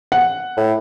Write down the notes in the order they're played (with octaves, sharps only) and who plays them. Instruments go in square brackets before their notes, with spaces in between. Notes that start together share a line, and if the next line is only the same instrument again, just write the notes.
[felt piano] F#5
[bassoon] A2